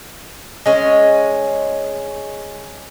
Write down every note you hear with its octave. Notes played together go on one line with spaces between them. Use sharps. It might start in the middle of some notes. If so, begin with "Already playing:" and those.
G#3 C#4